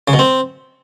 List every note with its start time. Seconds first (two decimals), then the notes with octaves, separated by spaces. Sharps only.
0.08 C#3
0.13 B2
0.19 C4